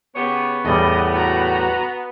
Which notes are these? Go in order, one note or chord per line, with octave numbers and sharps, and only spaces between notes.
C#3 B3 G4 C#5
E2 A2 G3 D#5
F#4 A#5